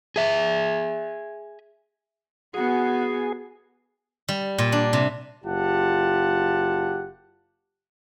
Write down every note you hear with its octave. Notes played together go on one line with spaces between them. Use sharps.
G#4 E5
B3 F#4 G#4
G3
A#2
D4
C3
F#1 F4 G4 F#5 A5